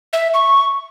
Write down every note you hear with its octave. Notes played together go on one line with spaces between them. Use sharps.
E5
C#6